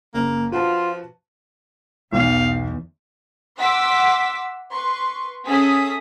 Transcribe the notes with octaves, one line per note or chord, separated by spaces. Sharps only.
F#1 A#3
F3 F4 F#4 B4 A5
B1 E2 F5
E5 F#5 C6 D6 E6 B6
B4 C6 C#6
C#4 G#4 A4 E5 D#6 B6